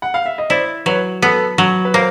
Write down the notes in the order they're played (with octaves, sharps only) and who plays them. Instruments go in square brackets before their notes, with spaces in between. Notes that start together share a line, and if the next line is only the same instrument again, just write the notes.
[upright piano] F#5
F5
E5
D#5
[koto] E4 [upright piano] C5 D5
[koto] F#3 [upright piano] B4 C#5
[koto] B3 [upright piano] A4 B4
[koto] F#3
[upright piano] B4
[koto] A#3 [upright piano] A#4 C5